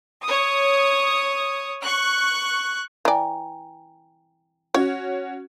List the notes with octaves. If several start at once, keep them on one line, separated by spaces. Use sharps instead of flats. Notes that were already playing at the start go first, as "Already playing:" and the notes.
C#5 D#6
C#6 F#6
E3 D5 G5 G#5 A#5
C#4 F#4 C#5